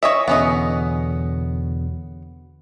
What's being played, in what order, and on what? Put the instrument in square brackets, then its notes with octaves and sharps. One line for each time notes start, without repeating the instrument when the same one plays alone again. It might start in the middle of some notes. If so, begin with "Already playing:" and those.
[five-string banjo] C#5 D#5 E5
[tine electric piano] E2 B2 D3 [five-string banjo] B3 C#4 D#5